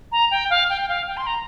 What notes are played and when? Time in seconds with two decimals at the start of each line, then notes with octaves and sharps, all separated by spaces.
0.12 A#5
0.31 G5
0.50 F5
0.70 G5
0.81 G5
0.89 F5
1.07 G5
1.17 C6
1.27 A#5